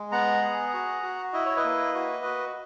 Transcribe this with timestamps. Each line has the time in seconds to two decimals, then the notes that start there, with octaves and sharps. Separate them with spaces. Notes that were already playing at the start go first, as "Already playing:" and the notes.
Already playing: G#3
0.12 B3 F#5 A#5
0.42 G#4
0.73 F#4
1.03 F#4
1.33 E4 D#5
1.46 C#5
1.57 B4 D#5
1.65 A#3
1.95 F#4
2.25 F#4